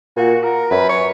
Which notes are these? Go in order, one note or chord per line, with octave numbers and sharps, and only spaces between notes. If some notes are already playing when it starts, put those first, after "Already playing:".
A#2 F#4
A#4
F#2 B4
C#5